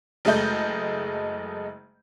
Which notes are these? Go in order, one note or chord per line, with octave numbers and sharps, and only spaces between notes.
F#1 G#3 A3 D#5 G6